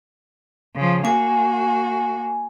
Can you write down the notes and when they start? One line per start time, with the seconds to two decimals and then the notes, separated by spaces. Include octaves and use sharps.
0.76 C#3 F3
1.05 A#3 F#4 G#5